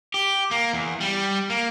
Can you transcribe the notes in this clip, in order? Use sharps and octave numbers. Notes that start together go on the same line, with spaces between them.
G4
A#3
E2
G3
A#3